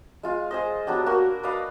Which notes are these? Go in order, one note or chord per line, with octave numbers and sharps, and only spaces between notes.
G#3 F4 F5
G#4 C5 D#5
F#3 B3 D4 G4
A#3 F#4 A#4
B4 D5 D#5 F5